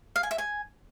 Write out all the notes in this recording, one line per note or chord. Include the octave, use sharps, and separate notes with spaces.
F5
G#5
E5
G#5